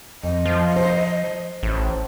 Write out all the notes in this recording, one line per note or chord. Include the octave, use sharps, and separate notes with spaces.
F2 D#5
F3
C5
A1